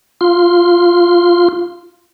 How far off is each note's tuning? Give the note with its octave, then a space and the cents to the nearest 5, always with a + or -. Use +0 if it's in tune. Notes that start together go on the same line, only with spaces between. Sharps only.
F4 +0 C6 +0